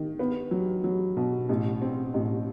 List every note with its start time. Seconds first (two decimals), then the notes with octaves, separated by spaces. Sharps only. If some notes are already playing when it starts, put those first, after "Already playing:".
Already playing: D#3
0.19 B3
0.51 F#3
0.84 F#3
1.17 B2
1.49 A1
1.82 C4
2.14 A1